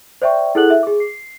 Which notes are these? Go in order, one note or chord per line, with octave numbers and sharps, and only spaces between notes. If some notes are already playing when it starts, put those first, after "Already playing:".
C5 D5 E5 G5 C#6
E4 G#4 A4 F#5 F#6 F#7
E5
G#4 D6
C7